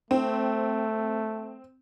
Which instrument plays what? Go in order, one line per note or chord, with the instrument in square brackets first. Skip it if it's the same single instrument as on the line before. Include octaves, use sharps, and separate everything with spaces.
[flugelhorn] A3 [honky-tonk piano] C4